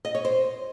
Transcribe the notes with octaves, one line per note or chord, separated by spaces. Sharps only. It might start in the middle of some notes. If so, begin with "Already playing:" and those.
D#5
C#5
C5